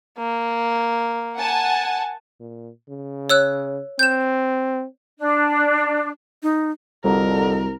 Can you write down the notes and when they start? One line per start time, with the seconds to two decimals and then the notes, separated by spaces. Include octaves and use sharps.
0.18 A#3
1.38 F#5 G#5 A5
2.40 A#2
2.89 C#3
3.30 C#5 E6 F#6
3.99 C4 G6 E7
5.18 D4
6.43 D#4
7.04 C2 F2 D3 G3 F#4 A#4 A#5